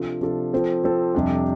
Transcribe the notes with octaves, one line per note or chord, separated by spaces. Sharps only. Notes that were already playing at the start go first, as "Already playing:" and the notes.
Already playing: C3 F3 D4 F4 A4
C3 F3 D4 F4 A4
F3 C4 A4
F3 C4 A4
F2 C3 G3 D4 G4